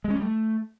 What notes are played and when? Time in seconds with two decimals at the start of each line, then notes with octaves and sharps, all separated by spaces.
0.04 G#3
0.10 C#4
0.16 G3
0.22 A3